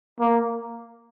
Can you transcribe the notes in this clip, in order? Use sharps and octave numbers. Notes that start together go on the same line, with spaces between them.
A#3